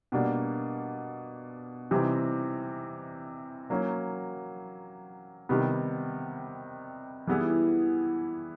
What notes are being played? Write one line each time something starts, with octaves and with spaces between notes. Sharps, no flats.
B2 G3 A#3 D4
C3 E3 G3 C4 D#4
F#3 A#3 C#4
C3 D#3 G3 B3
E3 G3 B3 E4 G#4